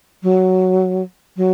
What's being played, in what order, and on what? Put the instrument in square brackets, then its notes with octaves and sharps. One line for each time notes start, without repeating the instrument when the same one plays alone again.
[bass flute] F#3
F#3